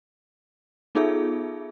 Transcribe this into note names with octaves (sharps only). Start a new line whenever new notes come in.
B3 D#4 F4 G#4 A4 E5